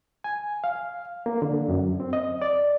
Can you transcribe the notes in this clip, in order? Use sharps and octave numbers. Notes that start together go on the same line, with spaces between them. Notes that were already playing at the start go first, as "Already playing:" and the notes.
G#5
F5
A#3
D3
F#2
C4
D#5
D5